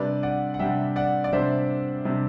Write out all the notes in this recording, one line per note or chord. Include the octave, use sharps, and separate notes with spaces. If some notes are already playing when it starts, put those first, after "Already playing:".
Already playing: C3 G3 D4 B4 D5
D5 F#5
F#5
C3 G3 D4 E5 G5
D5 F#5
D5
C3 G3 D4 C5 E5
C3 G3 D4